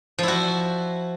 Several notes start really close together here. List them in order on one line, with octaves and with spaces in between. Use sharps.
F3 E4 F#4